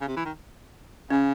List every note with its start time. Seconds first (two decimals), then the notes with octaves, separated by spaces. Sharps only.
0.01 C#3
0.08 C3
0.16 E3
0.25 D#3
1.10 C#3 C#4